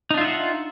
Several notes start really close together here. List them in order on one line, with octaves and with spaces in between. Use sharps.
D#4 D4 F4 E5 F#5